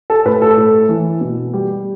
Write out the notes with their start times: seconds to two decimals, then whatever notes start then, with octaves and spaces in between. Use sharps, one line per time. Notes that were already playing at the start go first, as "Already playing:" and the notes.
0.10 A4
0.25 A2 B4
0.42 A4
0.57 A2
0.89 E3
1.21 B2
1.53 G3